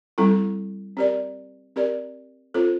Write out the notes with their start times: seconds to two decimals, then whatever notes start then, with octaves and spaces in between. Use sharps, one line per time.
0.18 G3 C4 E4 A4
0.97 C4 G4 A#4 D5
1.76 C4 G4 A#4 D5
2.54 C4 F4 A4 C5